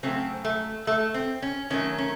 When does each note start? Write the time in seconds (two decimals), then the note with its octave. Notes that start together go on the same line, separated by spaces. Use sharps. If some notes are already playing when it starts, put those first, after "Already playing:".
0.03 C#3 F#3 A3 C4
0.45 A3
0.87 A3
1.14 C4
1.42 C#4
1.70 D#3 F#3 A3 C#4
1.98 C#4